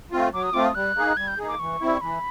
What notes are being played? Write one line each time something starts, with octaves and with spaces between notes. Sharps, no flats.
A3 C4 F4
F#3 D6
D#6
A3 C4 F4 D6
D#6
G3 F#6
A#3 D#4 G#4
G3 G#6
G6
A#3 D#4 G#4
D6
E3 C#6
G3 C4 E4
E3 B5